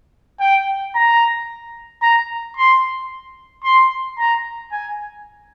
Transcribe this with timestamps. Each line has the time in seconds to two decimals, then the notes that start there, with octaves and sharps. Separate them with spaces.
0.40 G5
0.95 A#5
2.02 A#5
2.57 C6
3.64 C6
4.19 A#5
4.72 G#5